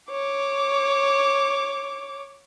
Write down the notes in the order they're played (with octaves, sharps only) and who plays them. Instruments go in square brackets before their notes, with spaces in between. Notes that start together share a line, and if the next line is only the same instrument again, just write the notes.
[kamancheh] C#5 D6